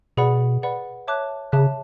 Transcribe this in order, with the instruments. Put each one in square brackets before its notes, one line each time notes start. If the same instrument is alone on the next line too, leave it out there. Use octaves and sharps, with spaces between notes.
[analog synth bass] B2 [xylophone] G#4 B4 D5 F#5 B5
[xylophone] G#4 B4 D5 F#5 B5
C#5 E5 A5 D6 F#6
[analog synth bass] C#3 [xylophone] C#5 E5 A5 D6 F#6